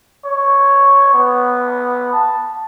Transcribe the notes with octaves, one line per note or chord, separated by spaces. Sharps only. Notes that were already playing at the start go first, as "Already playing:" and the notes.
C#5
B3
A5